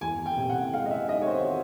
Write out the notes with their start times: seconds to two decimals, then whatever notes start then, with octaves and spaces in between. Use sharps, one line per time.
0.01 E2 G#5
0.26 G5
0.37 C3
0.50 F#5
0.73 G#3 F5
0.86 D#5
0.91 E5
1.09 D#3 D#5
1.22 C#5
1.27 C5
1.45 F#4